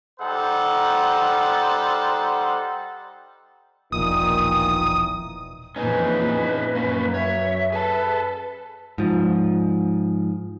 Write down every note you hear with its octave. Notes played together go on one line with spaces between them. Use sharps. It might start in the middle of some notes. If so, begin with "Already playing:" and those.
G3 D#4 A4 C5 F#5
E1 A#1 A#2 D#3 E3 D#6
F2 A#2 E3 C#4 D#4 G#4 B4
F#2 A#3 C#4
C#5 E5
G#4 A4 B4 A5
G#2 F3